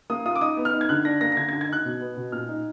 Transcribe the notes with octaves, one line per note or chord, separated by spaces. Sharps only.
A#3 D#6
F4 D#6
D6
D#4 D#6
B3
F6
D#4
G#6
D3 F#6
D4 A#6
A#3 A#6
A#6
D3 G#6
G#6
D3
G#6
D#4 F#6
B2
B3
B2
A#2 F6
D#4